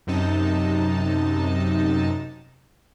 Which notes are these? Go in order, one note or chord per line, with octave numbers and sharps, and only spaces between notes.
F#2 C3 D#4 A5